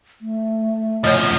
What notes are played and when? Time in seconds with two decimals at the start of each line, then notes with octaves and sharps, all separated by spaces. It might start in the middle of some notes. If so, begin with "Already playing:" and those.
0.21 A3
1.04 F#2 F3 C#5 D#5